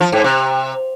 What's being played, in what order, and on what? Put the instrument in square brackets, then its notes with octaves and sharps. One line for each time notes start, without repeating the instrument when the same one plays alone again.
[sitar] F3
G#2
C3